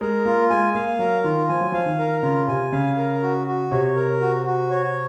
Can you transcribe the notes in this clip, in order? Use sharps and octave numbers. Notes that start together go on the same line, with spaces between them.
G#3 A#4
A#3 F4
G#3 G#5
A#3 F5
F#3 A#4
D#3 F4
F3 G#5
F#3
F3 F5
D#3
A#4
C#3 F4
C3 G#5
C#3 F5
A#4
F#4
F#4
C3 C#5
A#4
F#4
F#4
C#5